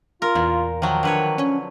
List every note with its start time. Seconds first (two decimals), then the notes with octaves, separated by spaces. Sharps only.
0.22 F4 A#4
0.35 E2 A#2
0.82 D#3 F3 F#3
1.03 D3 B4 C#5
1.38 C#4